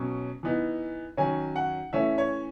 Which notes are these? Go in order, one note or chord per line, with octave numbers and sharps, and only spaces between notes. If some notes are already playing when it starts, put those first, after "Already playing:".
Already playing: B2 F#3 C#4
E3 B3 D#4
D#3 F#3 C#4 G#5
F#5
E3 A3 C#4 E5
C#5